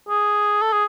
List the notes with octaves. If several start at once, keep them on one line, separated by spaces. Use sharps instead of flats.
G#4
A4
G#4